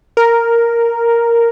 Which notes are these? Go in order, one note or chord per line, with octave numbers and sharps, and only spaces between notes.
A#4